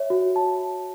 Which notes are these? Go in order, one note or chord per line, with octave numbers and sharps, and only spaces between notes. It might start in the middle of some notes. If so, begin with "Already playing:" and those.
Already playing: C#5 E5
F#4
A5